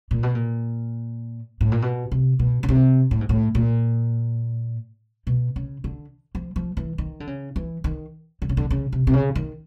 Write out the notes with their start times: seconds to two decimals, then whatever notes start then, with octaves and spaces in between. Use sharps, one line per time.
0.11 A#2
0.23 B2
0.35 A#2
1.61 A2
1.72 A#2
1.82 B2
2.11 C3
2.39 B2
2.63 C#3
2.69 C3
3.11 A2
3.21 G#2
3.29 A2
3.55 A#2
5.27 B2
5.56 C#3
5.84 D3
6.35 F3
6.56 F3
6.77 E3
6.98 D#3
7.20 D3
7.27 C#3
7.56 E3
7.84 D#3
8.42 D3
8.49 C#3
8.57 D3
8.70 C#3
8.92 C3
9.07 C3
9.13 C#3
9.35 D#3